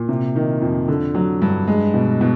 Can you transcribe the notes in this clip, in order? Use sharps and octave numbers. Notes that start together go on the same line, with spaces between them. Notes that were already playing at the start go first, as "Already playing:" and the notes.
Already playing: A#2
C3
D#3
F2
D3
F#3
G2
G#3
B2
B2